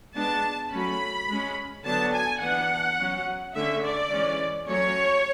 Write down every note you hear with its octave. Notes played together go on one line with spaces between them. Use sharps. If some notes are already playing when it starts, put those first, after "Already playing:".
G#3 B3 D4 A5
F#3 A3 C#4 B5
G#3 C#4
D3 F#3 B3 D4 A5
G#5
E3 B3 D4 F#5
F#3 C#4
D3 A3 C#4 E5
D5
E3 G#3 C#4
F#3 A3 C#4 C#5